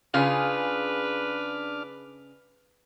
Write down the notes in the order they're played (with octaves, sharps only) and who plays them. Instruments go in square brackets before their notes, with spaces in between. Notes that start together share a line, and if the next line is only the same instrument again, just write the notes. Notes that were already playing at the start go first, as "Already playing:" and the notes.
[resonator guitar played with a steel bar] C#3 G#4 [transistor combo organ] D4 D6 F6 [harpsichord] F4 [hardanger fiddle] B4